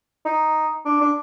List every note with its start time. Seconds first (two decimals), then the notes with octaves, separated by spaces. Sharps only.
0.25 D#4
0.85 D4
1.01 D4